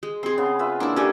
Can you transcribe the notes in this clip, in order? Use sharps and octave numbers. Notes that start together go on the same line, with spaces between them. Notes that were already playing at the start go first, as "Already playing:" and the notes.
G#3
C4 G#4 C6
C#3 B3
F4 B4 E5
A#3 D4 E4
C#4 D4 G4 A4 D#5 G#5